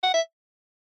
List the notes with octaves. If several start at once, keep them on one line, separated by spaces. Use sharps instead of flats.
F#5
E5